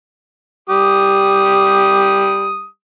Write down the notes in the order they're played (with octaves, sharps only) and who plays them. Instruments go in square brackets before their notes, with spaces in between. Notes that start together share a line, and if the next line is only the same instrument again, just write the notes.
[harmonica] G3 G4 D#6